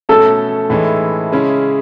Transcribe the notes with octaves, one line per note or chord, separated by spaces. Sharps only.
B2 A3 C#4 A4
A2 E3 G#3 D#4
C#3 G#3 C#4 E4